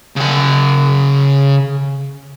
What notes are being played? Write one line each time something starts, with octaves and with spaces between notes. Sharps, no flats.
C#3 F#5